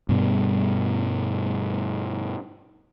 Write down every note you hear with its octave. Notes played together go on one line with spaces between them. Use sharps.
G2 B2 G3